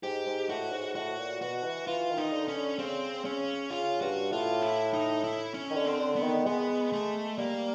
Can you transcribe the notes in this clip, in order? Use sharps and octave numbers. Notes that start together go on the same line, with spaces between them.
G#2 G4
G#2
A2 F#4
G#2
A2 F#4
A#2
B2 F#4
E3
E3 F4
D#3
D#4
D3
C#4
D3
C#3 C4
C#3 C#4
C#3 F4
G2 F#4
A2 F4
E4
D#4
E4
C#4
D#3
D3
C4
D3
B3
D#3
G#3 B3
A3
G3 A#3